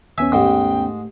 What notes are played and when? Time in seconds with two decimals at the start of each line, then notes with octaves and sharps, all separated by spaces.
0.18 D#2 B3 C#4 E5 G#5
0.32 G#2 A3 G4 G5